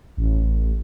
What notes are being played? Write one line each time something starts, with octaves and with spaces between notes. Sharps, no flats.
A1